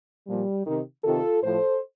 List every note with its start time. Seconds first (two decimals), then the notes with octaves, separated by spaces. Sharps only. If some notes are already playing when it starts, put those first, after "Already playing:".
0.27 A#2 F3 G3
0.67 C3 D#3
1.04 C3 D#3 F4 A4
1.43 A2 F3 A4 C5